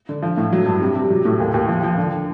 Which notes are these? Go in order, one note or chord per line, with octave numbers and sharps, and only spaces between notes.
D3
F3
A2
F#3
G2
C3
C3
F#3
A2
D#2
D#2
F3
F3
D3